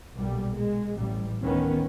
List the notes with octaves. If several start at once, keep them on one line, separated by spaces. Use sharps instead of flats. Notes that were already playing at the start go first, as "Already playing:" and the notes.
B1 A#2 G3
G#3
A1 G3
A1 D2 D#3 B3 C#4